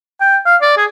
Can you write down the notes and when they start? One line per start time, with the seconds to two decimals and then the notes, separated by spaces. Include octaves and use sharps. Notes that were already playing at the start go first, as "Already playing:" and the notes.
0.21 G5
0.46 F5
0.61 D5
0.77 G#4